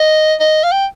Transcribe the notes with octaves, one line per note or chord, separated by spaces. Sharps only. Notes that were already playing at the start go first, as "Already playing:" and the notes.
Already playing: D#5
D#5
F5
G5